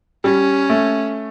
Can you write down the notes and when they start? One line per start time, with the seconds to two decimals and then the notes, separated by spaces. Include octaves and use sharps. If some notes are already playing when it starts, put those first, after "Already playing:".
0.24 G3 C#4
0.70 A3